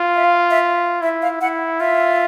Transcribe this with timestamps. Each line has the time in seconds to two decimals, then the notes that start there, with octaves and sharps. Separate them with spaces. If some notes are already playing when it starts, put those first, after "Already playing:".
Already playing: F4
0.16 E5
0.24 F5
0.50 E5
1.01 E4 E5
1.22 F5
1.41 E4 F#5
1.80 F4 E5